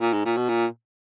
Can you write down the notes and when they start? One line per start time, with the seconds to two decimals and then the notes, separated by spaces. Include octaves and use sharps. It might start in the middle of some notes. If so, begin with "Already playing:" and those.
0.01 A#2
0.13 G#2
0.25 A#2
0.37 B2
0.49 A#2